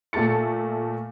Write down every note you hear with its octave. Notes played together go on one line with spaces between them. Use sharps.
A#2 A3 A4 A5 A6 C#7